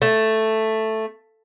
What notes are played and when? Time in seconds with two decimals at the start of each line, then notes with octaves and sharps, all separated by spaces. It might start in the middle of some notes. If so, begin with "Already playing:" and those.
0.02 A3